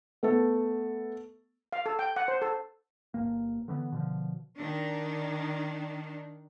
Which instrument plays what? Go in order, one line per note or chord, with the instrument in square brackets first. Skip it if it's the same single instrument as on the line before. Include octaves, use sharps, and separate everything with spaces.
[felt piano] A3 B3 A4
[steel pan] F5
A4
G5
F#5
C5
A4
[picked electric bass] G1 E2 G2 A#3
D3 E3 A3 B3
B2 D3 F3
[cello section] D#3 D4